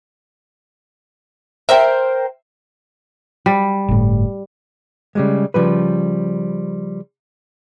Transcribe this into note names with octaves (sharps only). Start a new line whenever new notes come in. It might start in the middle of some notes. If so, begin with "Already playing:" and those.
A#4 C5 E5 G5
G3
G1 A2
C#3 G3 G#3
C#3 F3 G3 B4